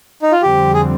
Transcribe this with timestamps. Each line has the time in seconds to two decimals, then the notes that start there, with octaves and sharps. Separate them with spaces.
0.22 D#4
0.32 F4
0.42 F2 D3 G3 C4 G4
0.74 G#4